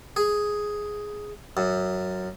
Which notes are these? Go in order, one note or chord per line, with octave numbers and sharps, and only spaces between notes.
G#4
F#2